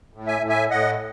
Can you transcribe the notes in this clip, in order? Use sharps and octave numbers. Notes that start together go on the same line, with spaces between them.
A2
E5 G#5
A2
E5 G#5
A2 D#5 F#5